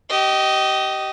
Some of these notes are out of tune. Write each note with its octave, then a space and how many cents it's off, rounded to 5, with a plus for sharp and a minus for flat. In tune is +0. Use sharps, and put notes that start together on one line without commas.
G4 -25 D#5 +0